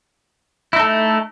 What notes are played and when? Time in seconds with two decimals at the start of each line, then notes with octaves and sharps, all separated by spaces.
0.73 E4
0.76 D#4
0.79 A4
0.83 A3